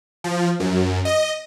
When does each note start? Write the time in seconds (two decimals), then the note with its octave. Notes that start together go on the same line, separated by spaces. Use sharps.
0.24 F3
0.60 F#2
1.05 D#5